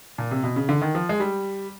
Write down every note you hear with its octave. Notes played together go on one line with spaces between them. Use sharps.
A#2
C3
B2
C#3
D3
D#3
F3
G#3
G3